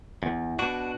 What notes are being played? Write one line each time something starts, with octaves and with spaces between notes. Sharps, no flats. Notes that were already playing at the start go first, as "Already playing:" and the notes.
E2
B2 D4 F#4